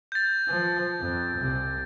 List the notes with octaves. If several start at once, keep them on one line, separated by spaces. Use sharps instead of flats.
G6 A6
F3
F2
C2 C3